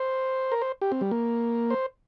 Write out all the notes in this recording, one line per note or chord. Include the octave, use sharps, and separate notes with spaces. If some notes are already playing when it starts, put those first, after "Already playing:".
Already playing: C5
A#4
C5
G4
C4
G3
A#3
C5